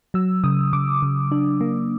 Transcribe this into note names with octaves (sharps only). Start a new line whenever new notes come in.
F#3 E6
C#3 D#6
C#3 D6
C#3
D4
A#3